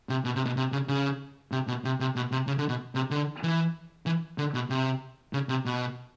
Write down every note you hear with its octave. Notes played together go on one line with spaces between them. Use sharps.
C3
B2
C3
B2
C3
C#3
C#3
C3
B2
C3
C3
B2
C3
C#3
D3
B2
C3
D3
E3
E3
D3
B2
C3
C#3
C3
B2